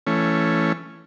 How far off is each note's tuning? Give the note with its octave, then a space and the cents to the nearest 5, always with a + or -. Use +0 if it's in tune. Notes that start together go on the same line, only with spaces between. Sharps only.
E3 +20 A3 +0 C#4 +0